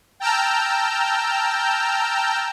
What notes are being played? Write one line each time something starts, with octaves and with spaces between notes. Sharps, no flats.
G5 A5 A#5 E6 F6 G6